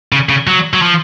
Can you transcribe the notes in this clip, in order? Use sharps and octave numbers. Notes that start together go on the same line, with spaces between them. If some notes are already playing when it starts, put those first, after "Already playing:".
C#3
C#3
F#3
F#3
F3